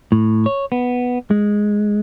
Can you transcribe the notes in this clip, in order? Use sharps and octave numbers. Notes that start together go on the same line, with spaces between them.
A2
C#5
B3
G#3